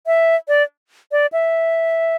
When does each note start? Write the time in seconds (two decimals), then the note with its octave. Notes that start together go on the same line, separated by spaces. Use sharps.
0.07 E5
0.48 D5
1.12 D5
1.33 E5